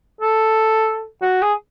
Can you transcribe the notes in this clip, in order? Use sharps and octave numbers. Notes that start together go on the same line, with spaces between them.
A4
F#4
G#4